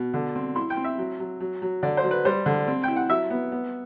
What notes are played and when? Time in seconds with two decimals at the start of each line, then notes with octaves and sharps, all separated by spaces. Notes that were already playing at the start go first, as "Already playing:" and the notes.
Already playing: B2
0.14 D3
0.35 C4
0.56 E4 C6
0.70 G5
0.77 C4
0.84 E5
0.98 F#3
1.20 F#3
1.40 F#3
1.62 F#3
1.83 D3 D5
1.97 C5
2.04 F#3
2.11 B4
2.25 G3 C5
2.46 D3
2.68 C4
2.83 E4 G5
2.96 F#5
3.09 F#3 E5
3.30 B3
3.52 B3